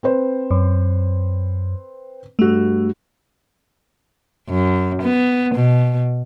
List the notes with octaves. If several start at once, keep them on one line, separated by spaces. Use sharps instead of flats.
C4 B4 C5
F#2
G2 A3 F#4
F#2
B3
B2